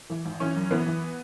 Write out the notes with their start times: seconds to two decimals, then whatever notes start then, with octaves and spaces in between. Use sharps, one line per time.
0.10 E3
0.25 G#1
0.40 E3 C#4
0.56 F#2
0.71 E3 B3
0.86 E3